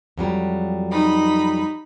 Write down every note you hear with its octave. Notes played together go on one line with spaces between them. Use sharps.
F2 F#3 G3
D#4 B5